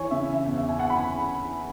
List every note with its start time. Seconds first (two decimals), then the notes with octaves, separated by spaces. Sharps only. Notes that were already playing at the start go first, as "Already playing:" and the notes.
Already playing: E3 C#5 G#5
0.10 C#3 E5
0.34 E5
0.45 E2
0.57 E5
0.69 G#5
0.79 E2 F#5
0.90 B5
0.96 G#5